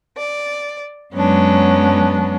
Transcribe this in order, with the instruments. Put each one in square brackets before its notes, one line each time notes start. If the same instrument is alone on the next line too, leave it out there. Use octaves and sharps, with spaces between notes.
[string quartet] D5
F#2 F#3 G#3 B3 C#4 D4